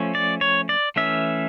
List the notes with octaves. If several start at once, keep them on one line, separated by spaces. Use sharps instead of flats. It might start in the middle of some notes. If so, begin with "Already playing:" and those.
Already playing: F3 A3 C#4
D5
C#5
D5
E3 A3 C#4 E5